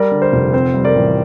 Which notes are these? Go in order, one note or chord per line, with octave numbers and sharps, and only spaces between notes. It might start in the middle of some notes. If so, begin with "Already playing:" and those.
Already playing: G3 A#4 D5
D3
C5
F1
C4 C5
G3
A#4 D5
A1